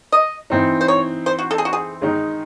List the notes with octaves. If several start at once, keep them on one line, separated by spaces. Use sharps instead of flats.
D#5
E3 C4 D#4
C5
C#5
C5
F#4
A4
G#4
F#4
G#4
D#3 G#3 D#4